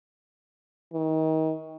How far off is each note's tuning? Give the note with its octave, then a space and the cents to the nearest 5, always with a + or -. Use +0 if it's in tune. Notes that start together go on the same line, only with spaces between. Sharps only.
D#3 +30